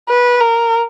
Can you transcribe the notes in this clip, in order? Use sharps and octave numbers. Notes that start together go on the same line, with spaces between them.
B4
A#4